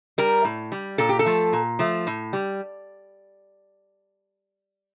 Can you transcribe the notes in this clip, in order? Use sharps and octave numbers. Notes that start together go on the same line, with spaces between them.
G3 A#4
A2
G3
A#2 A4
G4
A4
F3 A3
A#2
F3 A3
A2
G3